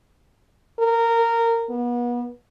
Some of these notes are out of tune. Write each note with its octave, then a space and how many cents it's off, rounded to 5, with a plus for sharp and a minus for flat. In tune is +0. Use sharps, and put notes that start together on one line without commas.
A#4 -15
B3 -35